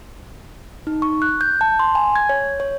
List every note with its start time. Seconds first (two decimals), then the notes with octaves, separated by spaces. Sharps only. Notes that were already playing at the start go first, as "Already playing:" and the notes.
0.87 D#4
1.02 C#6
1.22 F#6
1.41 G6
1.61 A5
1.79 C6
1.95 G#5
2.16 G#6
2.29 C#5
2.60 C#5